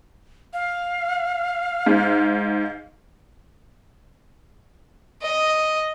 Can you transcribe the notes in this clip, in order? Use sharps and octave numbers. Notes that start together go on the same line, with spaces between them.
F5
G#2
D#5